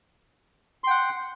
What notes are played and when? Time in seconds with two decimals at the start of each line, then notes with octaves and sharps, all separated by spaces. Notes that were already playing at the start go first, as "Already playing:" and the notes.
0.84 C6
0.87 G5
0.90 F#5